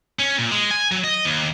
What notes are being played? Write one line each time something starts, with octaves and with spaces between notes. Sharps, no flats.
C#4
A#2
G#3
G#5
F#3
D#5
D#2